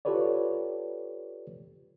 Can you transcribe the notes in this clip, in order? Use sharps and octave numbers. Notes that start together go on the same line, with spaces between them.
F4 G4 A4 B4 C#5 D5